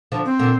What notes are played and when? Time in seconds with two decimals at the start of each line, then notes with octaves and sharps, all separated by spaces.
0.12 D3 F3
0.25 C4
0.39 A#2 D3